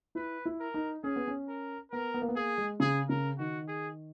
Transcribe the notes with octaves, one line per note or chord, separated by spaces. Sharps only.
E4 B4
E4
A#4
D#4
C#4 G#4
B3
C#4
A#4
B3 A#4
B3
A#3
B3
A#3 G#4
G#3
C#3 G#4
C#3 A#4
D#3 F#4
G#4